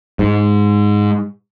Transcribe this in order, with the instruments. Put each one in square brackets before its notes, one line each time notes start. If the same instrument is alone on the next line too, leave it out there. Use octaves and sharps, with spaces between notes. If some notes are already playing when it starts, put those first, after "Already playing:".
[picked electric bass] G#2